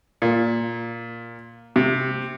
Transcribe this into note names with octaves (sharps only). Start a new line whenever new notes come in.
A#2
C3